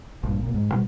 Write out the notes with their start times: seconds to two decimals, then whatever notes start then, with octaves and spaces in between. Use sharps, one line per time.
0.23 A#1 G2
0.43 B1 A#2
0.54 G#2
0.72 B2 G3